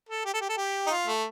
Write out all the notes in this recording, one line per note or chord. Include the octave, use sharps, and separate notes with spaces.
A4
G4
A4
G4
A4
G4
D#4
F4
A3